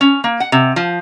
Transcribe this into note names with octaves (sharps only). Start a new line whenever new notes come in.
C#4
A#3
F#5
C3
F3